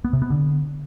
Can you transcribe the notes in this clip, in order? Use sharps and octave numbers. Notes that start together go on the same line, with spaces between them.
B3
C3
B3
D3